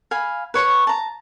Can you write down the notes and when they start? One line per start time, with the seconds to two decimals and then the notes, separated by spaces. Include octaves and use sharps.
0.11 F5 G#5 B5
0.54 B4 C#5 C6 C#6
0.87 A5 A#5